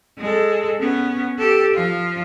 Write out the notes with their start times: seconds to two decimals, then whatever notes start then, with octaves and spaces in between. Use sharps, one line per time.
0.18 G#3 A4
0.80 B3 C#4
1.38 G4 A4
1.74 F3 F4